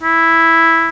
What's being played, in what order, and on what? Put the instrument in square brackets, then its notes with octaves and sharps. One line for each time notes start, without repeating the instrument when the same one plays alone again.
[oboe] E4